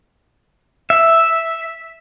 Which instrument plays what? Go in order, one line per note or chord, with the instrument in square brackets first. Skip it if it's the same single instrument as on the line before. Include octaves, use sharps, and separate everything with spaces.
[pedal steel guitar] E5